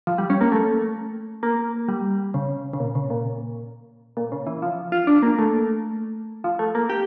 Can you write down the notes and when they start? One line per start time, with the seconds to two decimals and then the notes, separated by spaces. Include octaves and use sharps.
0.07 F3
0.18 G3
0.30 C#4
0.41 A#3
0.52 A3
1.43 A#3
1.88 G3
2.34 C#3
2.73 C#3
2.80 A#2
2.95 C#3
3.10 A#2
4.17 A#2
4.32 C#3
4.47 E3
4.62 F3
4.92 F4
5.07 D4
5.23 A#3
5.39 A3
6.44 F3
6.59 A3
6.75 A#3
6.90 G4